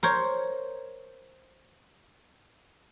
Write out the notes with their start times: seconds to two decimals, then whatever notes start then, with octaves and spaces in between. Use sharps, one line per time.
0.03 A#4 C5 C#5